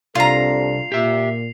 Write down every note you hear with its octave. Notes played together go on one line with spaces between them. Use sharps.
C2 C3 D4 F4 A4 A#5 C7 F7
A#2 G4 E5